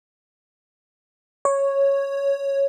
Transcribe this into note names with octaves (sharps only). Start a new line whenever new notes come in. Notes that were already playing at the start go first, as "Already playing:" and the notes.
C#5